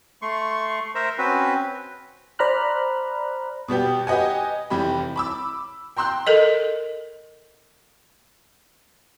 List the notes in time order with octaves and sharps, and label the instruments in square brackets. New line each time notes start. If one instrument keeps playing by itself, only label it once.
[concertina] A3 C6 C#6
A#4 C5 E5 A#5
C4 C#4 F#4 B4
[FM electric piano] C5 D5 A#5 B5 F6 F#6
[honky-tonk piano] B2 G3 B3 G4
G4 B4 D#5 F#5 G#5
F1 E3 G3 G4 B5
B5 D6 E6
G5 A#5 C6 E6 F#6 G6
[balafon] A4 A#4 D#5